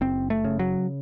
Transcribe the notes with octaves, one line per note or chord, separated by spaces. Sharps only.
F#1 C4
A3
C#3
F#3